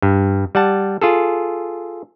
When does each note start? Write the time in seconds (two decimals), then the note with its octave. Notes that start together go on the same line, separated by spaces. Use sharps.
0.02 G2
0.55 G3 F#5 A5
1.02 F4 G#4 A4